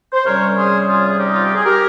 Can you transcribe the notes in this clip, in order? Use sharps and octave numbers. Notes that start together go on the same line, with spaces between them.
C5
C3 G3 C#4 A#4 C#5
G#4 C5
F4 G#4
G#4
D#4 G4
F4
G4
G#4
G4 A#4